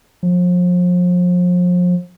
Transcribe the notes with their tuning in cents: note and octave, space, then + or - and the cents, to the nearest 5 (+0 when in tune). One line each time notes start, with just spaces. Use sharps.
F3 +35